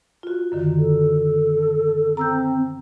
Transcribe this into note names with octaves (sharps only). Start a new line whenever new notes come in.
F4 F#4
F#2 D3 D#3
A4
C4 A#5 E6 G6